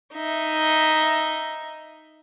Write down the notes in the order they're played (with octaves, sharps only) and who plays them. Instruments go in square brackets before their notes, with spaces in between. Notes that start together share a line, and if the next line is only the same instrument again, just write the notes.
[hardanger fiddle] D#4 E5